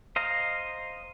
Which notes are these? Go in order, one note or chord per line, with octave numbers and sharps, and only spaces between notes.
C5 D#5 F5 A#5